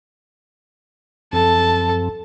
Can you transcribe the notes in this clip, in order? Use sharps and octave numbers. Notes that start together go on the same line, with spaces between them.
F#2 F3 C4 A4 A5